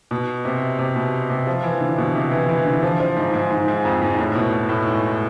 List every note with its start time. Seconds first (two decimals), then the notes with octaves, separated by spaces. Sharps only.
0.11 B2
0.45 C3
0.79 C3
0.96 B2
1.30 C3
1.47 F3
1.63 E3
1.81 D3
1.98 B2
2.15 C3
2.32 E3
2.49 E3
2.66 D3
2.83 F3
3.00 F3
3.16 G#2
3.34 G#2
3.50 G#2
3.68 G#2
3.85 F2
4.01 G#2
4.19 A2
4.35 B2
4.52 B2
4.69 A2
4.86 G#2